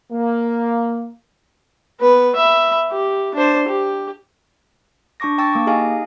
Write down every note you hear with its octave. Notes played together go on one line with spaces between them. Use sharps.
A#3
B3 B4
E5 B5
G4
D4 C5
G4
D4 A5 C#6 D6 A#6
G5 A5 C#6 E6 A6
A#3 D6
D#4 G4 G#4 D#5 F5 G#5